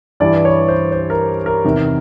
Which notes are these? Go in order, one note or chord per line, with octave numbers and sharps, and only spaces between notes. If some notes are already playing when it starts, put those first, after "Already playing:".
G2 E3 G3 D5
C#5
C5
C5
A#4
A#4
E2 C3 D#3